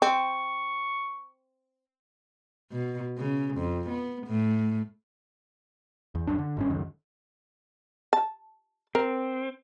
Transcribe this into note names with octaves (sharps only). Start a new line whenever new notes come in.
C4 C#6
B2
C#3
F2
B3
A2
E2
D1 C#2 F#2 D4
D3
G#1 G2 C#4
C#2 F#2 D#3
A5
C4 A#4